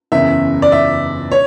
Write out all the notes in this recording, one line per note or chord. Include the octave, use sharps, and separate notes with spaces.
F#1 E2 C#3 E5
D5
E5
C#5